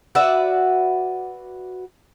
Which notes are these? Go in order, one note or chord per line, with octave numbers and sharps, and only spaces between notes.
F#4 B4 D5 E5